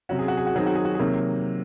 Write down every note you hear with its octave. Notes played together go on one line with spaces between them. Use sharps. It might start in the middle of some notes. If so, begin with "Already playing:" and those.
C3 F#3 C#4 F#4
G#4
F#4
G#4
F#4
D#3 F#3 C4 D#4 G#4
F#4
G#4
F#4
G#4
C3 D#3 F#3 A#3